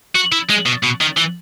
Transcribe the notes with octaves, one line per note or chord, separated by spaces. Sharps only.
F#4
E4
G#3
B2
B2
D#3
E3